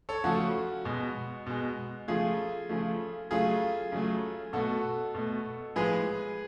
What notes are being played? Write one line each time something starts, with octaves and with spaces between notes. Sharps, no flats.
A4 C#5
C#3 F3 A3 F#4
B2 G#3
B2 G#3
C#3 F3 A3 F4 G#4
C#3 F3 A3
C#3 F#3 A3 F4 G#4
C#3 F#3 A3
B2 A3 F#4 A4
B2 A3
A2 F3 G#3 G#4 B4